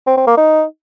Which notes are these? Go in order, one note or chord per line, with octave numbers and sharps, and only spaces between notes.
C4
C4
A#3
D#4